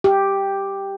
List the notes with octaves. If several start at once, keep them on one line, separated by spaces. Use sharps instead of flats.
G4